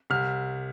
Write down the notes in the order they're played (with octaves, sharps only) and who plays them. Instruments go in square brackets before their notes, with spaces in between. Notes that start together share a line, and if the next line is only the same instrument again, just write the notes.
[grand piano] C2 F6